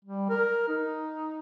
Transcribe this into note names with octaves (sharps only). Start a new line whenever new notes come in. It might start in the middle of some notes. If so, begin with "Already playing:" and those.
G3
A#4
D#4